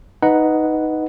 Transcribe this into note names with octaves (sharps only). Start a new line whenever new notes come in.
D#4 B4 D#5 F#5